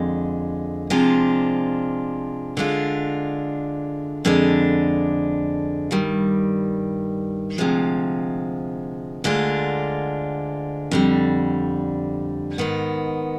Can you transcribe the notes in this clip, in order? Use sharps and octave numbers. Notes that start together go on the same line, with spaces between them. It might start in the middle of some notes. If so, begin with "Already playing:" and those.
Already playing: F2 D3 G#3
C3 F3 G#3 D4 F4
D3 G#3 D4 F4
F2 D3 G#3 D4
G2 D#3 G3
D2 C3 F3 G#3
D2 D3 G#3 D4 F4
F2 D3 G3
G#2 D#3 B3